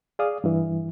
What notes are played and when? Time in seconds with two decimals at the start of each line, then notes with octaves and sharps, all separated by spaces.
0.19 G#4 D5 F5 D#6
0.44 G2 E3